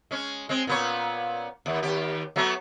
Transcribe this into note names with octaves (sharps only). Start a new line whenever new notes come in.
G#3 C#4
G#3 C4
A#2 B3 C#5
D#2
D#2 G4
F#3 A3 B3